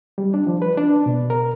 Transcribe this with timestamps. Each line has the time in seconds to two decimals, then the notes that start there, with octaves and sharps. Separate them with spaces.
0.18 G3
0.34 D4
0.47 F3
0.62 B4
0.78 D4
1.06 B2
1.30 A#4